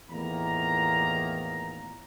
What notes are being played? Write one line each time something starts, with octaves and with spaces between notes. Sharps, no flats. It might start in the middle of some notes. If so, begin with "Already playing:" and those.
E2 A2 D#3 A#3 F4 A#5